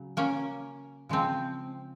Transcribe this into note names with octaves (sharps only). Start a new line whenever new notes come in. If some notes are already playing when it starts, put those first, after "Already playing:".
Already playing: C#3 F#3
A#3 C#4
C#3 F3 G#3 C4